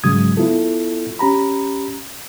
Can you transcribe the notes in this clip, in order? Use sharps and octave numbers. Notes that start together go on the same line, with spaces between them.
G#2 C#3 F#3 G#3 D#6 G#6
B3 E4 F4 A4
C#4 G4 A#5 B5